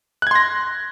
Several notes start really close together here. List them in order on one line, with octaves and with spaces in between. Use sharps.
F#6 G#6 C6 A#6